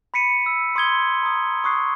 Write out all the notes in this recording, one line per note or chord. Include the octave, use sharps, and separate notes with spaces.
B5 B6 C#7 D#7
E6
C6 D#6 G#6 G7
A#5 D#6
C#6 D#6 F#6 C7